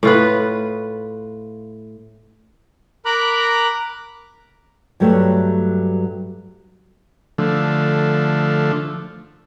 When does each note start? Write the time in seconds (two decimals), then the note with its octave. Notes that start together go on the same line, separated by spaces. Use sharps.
0.03 A2 F4 B4
3.05 A#4 A#5 B5 D6 F#6
5.00 G2 F#3 G3 A3
7.38 D3 F3 A3